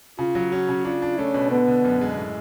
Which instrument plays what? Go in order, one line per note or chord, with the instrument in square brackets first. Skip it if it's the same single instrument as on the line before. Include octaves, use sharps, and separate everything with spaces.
[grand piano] C#3 [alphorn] F4
[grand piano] F#3
[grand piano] C#4 [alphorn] F#4
[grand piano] C#3
[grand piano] D4 [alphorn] F4
[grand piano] D4
[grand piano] A3 [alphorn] C#4
[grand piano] B2
[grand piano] D3 [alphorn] B3
[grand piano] D3
F#2
G#3
A2